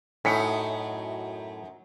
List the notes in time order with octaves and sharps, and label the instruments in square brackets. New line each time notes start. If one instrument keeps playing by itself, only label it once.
[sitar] F#2 F#3 D#4 [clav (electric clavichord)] A2 [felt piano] G#5 B6 C#7